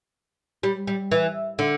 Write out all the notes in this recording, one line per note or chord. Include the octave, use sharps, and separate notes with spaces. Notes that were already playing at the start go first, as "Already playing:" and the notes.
G3
G3
E3
D3